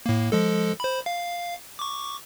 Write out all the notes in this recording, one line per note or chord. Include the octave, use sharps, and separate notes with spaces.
A2 A#3
F3 G#3 A4
C5 B5
F5
C#6 D6